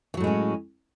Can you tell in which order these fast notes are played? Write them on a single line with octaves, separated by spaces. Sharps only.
E3 F#3 A2 G#3 C#4